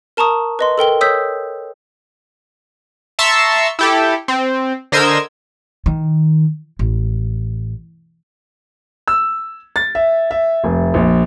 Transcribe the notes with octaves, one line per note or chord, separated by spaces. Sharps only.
A#4 A5 A#5 C#6 D#6
B4 D#5 C6
A4 A#4 G5 G7
C#5 D#6 E6 G6 B6
E5 A5 A#5 C6 C#6 E6
E4 G4 A4
C4
D3 A#4 C5 D#5 E6 G#6
D#3
A1
E6
A6
E5
E5
F1
A#1